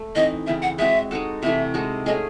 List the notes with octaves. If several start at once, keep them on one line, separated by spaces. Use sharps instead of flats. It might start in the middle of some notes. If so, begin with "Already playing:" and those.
Already playing: A3
E3 C4 D#4 D#5
C#3 E3 C4 E5
F#5
G#3 C4 F#4 E5
G#3 D#4 F#4 A4
C3 E3 A3 E5
G#3 D#4 F#4 A4
A3 C#4 G#4 D#5